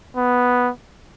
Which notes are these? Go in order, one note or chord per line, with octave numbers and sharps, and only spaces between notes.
B3